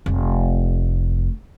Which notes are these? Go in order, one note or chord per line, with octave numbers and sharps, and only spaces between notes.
F1 A3